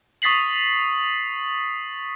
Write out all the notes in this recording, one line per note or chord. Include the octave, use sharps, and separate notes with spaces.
C#6 D#6 A6 B6 C7 F#7